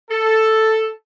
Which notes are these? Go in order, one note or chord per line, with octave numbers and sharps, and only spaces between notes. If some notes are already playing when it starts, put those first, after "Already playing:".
A4